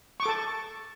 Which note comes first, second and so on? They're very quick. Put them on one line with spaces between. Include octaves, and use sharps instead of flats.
C#6 D6 A4 A5